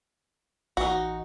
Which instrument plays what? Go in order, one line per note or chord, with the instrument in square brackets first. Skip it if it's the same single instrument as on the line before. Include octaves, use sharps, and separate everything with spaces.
[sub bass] A1 [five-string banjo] D#4 F#4